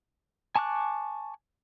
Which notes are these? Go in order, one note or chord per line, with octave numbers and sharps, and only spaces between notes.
G#5 A5 C#6 D6 F#6